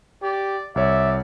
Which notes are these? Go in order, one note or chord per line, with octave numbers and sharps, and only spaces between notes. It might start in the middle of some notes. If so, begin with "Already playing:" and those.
G4 D5
C2 C#5 D5 E5